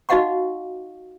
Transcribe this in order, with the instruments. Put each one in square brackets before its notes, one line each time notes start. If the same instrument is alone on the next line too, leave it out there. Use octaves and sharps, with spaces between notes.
[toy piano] D#4 F#4 D#5 F5 F#5 C#6